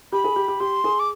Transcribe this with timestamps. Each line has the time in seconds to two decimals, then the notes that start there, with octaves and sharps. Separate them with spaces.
0.12 G4 B5
0.24 G#4
0.36 G4
0.48 G4
0.60 G4 C6
0.84 G#4
1.00 D6